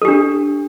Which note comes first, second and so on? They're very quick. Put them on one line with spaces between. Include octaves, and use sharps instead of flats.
A4 G4 D4